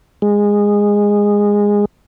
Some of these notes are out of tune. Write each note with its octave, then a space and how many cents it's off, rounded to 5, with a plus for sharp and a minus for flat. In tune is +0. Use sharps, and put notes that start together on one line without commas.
G#3 -15